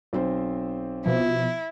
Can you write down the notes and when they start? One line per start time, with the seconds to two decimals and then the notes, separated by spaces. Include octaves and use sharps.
0.13 B1 C4 C5
1.06 B2 F3 E4